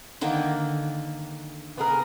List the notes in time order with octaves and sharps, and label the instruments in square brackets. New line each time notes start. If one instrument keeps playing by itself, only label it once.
[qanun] D3 D#3 A#3
[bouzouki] B3 G#4 A#4